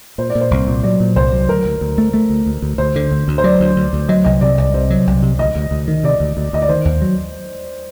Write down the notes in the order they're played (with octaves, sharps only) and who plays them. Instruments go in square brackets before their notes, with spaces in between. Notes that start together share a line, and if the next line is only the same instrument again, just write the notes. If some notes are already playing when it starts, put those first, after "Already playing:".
[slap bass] A#2 [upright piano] C5
[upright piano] D5
[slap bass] A#2
[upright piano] C5
[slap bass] C2
A#2
[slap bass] F#3 [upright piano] D5
[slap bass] A#2
[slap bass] C2 [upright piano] C5
[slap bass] F#3
[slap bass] D2 [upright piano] A#4
[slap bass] D2
D2
A3
A3
D2
D2
D2
[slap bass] D2 [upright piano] C5
[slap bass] D3
D2
D2
[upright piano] C5
[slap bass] F#3 [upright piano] D5
[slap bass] D2
D2
D2
[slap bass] F#3 [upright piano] D#5
[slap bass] C2 [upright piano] D#5
[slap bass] C3 [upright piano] D5
[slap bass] C2 [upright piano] D5
[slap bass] C3 [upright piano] C5
[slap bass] F#3
C2
C3
[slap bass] D2 [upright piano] D#5
[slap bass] D2
D2
D#3
[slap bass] C3 [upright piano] D5
[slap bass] D2
D2
[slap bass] D2 [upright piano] D#5
[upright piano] D5
[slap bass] D#3 [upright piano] C5
[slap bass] D#2
F#3